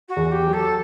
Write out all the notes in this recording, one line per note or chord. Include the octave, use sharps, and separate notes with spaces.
F#4
E2
G4
F#3
A4